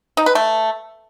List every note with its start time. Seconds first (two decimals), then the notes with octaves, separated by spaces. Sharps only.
0.17 D#4
0.26 B4
0.35 A3